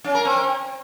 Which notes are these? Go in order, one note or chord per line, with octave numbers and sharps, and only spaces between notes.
C#4
A#4
C4